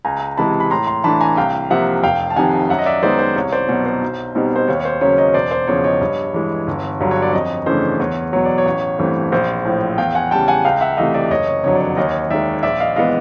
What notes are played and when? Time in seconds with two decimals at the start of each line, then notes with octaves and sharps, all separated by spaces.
0.05 C#2 G#5 A#5
0.37 C3 E3 G#3 A5 B5
0.60 B5
0.70 A2 A#5 C6
0.87 A#5 C6
1.04 E3 A3 D4 A5 B5
1.21 G#5 A#5
1.37 C2 F5 G5
1.70 C3 F3 A#3 E5 F#5
2.04 F1 F5 G5
2.30 A5
2.36 F2 C3 D#3 F#5 G#5
2.69 F#2 E5 F#5
2.79 D#5
2.86 D5 E5
3.03 D#3 G#3 B3 D#4 C5 D5
3.19 C5
3.36 C2 C#5
3.52 C5 D5
3.69 B2 F#3 C#5
3.86 C5
4.02 B1
4.35 B2 G3 C4 D#4
4.56 C5
4.68 D#2 C#5
4.80 C#5
4.85 C5
5.01 C#3 F#3 A#3 C#4 C#5
5.18 C#5 D#5
5.34 E1 C5 D5
5.51 C5
5.68 E2 C#3 F3 C#5
5.84 C#5 D#5
6.01 G2
6.34 E3 G#3
6.67 G1
7.00 G2 D3 F#3
7.11 C#5
7.22 D5
7.33 F2 C#5 D#5
7.66 C#3 E3 A3 D4 C5
8.00 E2 C#5
8.33 B2 F#3 C#5
8.45 D5
8.58 C#5
8.65 A1
8.99 G2 E3 A3 C4
9.32 A#1 C5
9.65 A2 F3
9.98 E2 F5 G5
10.15 F#5 G#5
10.31 C#3 E3 G3 G5 A5
10.48 F#5 G#5
10.65 C#2 F5 G5
10.81 E5 F#5
10.97 C3 E3 A3 D#5 F5
11.14 D5 E5
11.30 F#1 C#5 D#5
11.48 C#5
11.64 F2 D3 F#3 C#5
11.75 D5
11.80 C#5
11.97 D#2 C#5 D#5
12.30 D#3 G#3 D5 E5
12.63 A#1 D5 E5
12.80 D#5 F5
12.96 E3 G#3 B3 D#5 F5